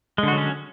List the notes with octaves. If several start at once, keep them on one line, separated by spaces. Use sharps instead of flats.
D3 F#3 G#3 C#4 F#4